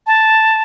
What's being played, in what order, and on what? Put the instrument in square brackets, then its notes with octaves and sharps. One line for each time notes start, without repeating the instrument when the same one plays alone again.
[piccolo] A5